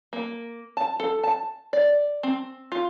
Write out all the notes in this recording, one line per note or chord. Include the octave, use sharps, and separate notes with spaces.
A#3
A5
A4
A5
D5
C4
F4